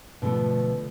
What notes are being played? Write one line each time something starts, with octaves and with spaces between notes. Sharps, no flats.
B2 D3 F3 A3